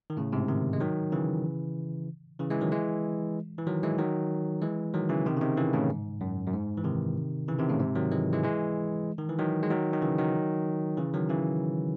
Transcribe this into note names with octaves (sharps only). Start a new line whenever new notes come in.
D#3
A2 C#3
G#2 C3
C3 D#3
G#3
D#3 F#3
C#3 E3
C#3 E3
E3 G#3
D#3 F#3
E3 G#3
E3
D#3 F#3
E3 G#3
D#3 F#3
E3 G#3
D#3 F#3
C#3 E3
C3 D#3
C#3
C3 D#3
C#3 E3
A2 C#3
G#2
F#2
F#2
G#2
E3
C3 D#3
C#3 E3
C3 D#3
A2 C#3
G#2 C3
D#3 F#3
E3 G#3
E3 G#3
E3 G#3
D#3
E3
D#3 F#3
G#3
D#3 F#3
D#3
C#3 E3
D#3 F#3
C#3 E3
D#3 F#3
C#3 E3